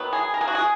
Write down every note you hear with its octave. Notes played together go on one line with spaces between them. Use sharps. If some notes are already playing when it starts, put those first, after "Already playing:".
Already playing: D#3 F#3 B3
G#4
A#4
G#4
F#4
G#4